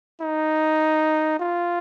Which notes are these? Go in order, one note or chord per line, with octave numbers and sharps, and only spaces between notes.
D#4
F4